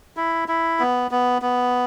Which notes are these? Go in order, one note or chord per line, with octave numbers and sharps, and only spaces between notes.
E4
E4
B3
B3
B3